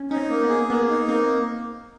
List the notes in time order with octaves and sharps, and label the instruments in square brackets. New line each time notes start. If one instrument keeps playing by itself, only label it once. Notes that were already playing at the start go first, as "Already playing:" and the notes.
Already playing: [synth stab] C#4
[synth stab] C#4 [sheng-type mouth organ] D#4
[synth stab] C4
[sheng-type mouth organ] A#3
[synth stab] B3
[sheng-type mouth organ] G#4
[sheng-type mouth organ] A#3 [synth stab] B3
[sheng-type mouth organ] D#4
[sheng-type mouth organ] A#3 [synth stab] C4